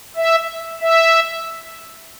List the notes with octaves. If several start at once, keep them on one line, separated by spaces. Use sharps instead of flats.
E5
E5